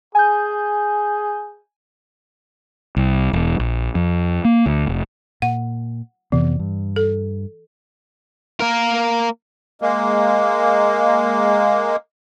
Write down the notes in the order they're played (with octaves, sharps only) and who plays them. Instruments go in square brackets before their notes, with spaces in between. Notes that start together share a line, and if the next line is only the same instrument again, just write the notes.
[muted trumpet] G#4 [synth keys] G#5 G6
[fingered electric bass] C2
E1
A#1
F2
A#3
D2
F1
[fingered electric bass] A#2 [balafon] F#5
[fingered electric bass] F2 C3 B3 [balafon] E3
[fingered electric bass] G2
[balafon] A4
[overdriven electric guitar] A#3 A#4
[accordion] G#3 A#3